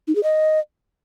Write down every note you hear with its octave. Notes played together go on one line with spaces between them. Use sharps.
D#4
G#4
D#5